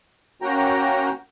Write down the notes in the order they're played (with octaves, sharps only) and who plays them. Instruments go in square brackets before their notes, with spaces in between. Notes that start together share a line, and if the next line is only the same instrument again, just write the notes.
[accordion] A#3 C#4 F#4 G5 A#5